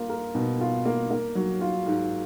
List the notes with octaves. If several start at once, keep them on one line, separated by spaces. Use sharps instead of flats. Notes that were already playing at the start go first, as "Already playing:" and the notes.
Already playing: A#3 F4
A#4
B2
F4
A#3
A#3
F#3
F4
G#2